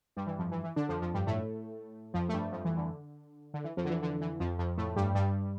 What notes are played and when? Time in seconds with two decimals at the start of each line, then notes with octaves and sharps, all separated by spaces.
0.16 G2 G3
0.27 E3
0.39 F2 F3
0.51 E3
0.64 E3
0.76 D3 D4
0.89 F2 F3
1.01 F2 F3
1.14 G2 G3
1.27 A2 A3
2.14 F2 F3
2.29 A3
2.33 G2 G3
2.52 F2 F3
2.65 E3
2.77 D3
3.54 D3
3.64 E3
3.77 F2 F3
3.85 D3
3.90 E3
4.02 D3
4.21 E3
4.40 F2 F3
4.59 F2 F3
4.77 A2 A3
4.96 G2 G3
5.15 G2 G3